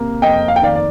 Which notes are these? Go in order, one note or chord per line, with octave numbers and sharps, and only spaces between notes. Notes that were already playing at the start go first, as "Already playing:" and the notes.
Already playing: C3 A#3
F2 D#5 G5
F5
G5
D#3 D5 F5
D5